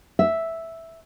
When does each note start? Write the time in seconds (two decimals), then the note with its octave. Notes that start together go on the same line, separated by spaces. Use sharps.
0.19 E5